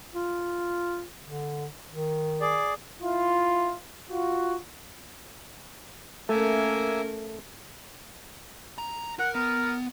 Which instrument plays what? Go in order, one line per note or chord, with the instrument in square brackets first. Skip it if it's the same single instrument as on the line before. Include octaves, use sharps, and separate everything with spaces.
[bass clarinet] F4
D3
D#3
[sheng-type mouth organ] G#4 D5
[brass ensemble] E4 F4
F4 F#4
[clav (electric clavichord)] A3 [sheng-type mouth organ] A#3 E5 G#5 [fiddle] C#4 A#4
[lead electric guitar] A#5
[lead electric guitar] A#4 [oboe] F#5
[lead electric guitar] B3 [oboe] A#4